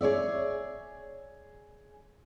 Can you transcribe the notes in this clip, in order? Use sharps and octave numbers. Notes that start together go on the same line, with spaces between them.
G#4 C#5 D5 E5